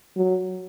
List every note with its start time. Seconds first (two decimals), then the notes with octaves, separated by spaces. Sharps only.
0.17 F#3